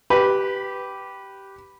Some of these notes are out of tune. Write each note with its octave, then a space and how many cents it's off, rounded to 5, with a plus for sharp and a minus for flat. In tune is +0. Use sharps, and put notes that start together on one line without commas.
G4 -10 B4 +0